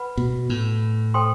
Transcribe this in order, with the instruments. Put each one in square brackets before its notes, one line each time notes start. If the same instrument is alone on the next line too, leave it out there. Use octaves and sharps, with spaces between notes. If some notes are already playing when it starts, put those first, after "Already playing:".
Already playing: [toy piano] B4 F#5 B5
[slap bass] B2
A2
[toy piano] A4 C5 G5 C6